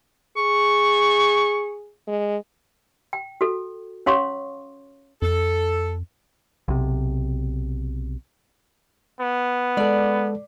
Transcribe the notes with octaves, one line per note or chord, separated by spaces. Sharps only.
G#4 C#6
G#3
G5
F#4 A4
C#4 C#5 F5 C6 C#6 D#6
F2 A4
B1 C3
B3
G#3 A4 D5